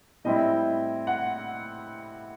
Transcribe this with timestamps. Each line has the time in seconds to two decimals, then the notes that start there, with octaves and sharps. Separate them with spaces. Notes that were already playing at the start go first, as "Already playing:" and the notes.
0.24 A2 G3 C4 E4 D#5
1.07 F#5